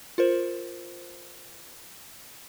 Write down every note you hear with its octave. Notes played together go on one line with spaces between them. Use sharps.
F4 A#4 C5